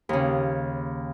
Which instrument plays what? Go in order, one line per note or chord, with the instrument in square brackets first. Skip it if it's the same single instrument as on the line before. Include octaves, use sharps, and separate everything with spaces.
[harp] D#2 C#3